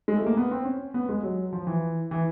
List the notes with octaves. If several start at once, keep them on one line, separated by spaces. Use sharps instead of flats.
G#3
A3
A#3
B3
C4
C#4
B3
G#3
F#3
F3
E3
E3